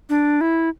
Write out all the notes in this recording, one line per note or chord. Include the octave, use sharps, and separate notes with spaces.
D4
E4